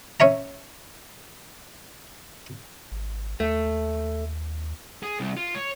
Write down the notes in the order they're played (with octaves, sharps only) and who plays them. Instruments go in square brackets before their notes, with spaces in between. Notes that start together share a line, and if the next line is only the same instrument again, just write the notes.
[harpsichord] C#4 C#5 E5 A#5
[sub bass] G#1
[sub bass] D#2 [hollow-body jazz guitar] A3
[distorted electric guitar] G#4
C2
F4
C#5